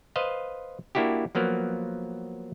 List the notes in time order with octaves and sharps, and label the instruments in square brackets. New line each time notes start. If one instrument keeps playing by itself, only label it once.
[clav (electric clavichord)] B4 C5 D#5 F5
A#3 D4 E4 F#4 G4
F3 F#3 A#3 B3 A#4